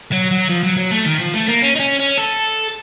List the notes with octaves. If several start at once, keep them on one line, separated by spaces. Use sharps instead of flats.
F#3
F#3
F3
F#3
F#3
A3
D#3
F3
A3
A#3
C#4
D#4
C#4
C#4
A4